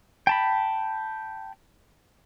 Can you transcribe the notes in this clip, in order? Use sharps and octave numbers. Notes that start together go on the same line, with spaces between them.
G5 A5 B5